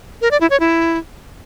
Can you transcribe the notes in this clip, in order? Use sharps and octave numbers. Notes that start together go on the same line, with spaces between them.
A#4
D5
E4
C#5
E4